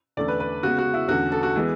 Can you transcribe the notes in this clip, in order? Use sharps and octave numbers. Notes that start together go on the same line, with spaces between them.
E2 D3 A3 C#4 D5
B4
B4
C#3 G#3 B3 F#4
F#4
E4
E2 D3 A3 C#4 F#4
A4
F#4
E3 G#3 B3